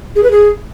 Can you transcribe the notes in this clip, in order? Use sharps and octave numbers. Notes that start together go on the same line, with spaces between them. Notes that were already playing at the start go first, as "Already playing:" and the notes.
G#4
B4
G#4